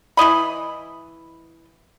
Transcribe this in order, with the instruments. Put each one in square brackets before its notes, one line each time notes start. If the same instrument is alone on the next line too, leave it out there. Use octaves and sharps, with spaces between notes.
[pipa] E3 E4 D#5 B5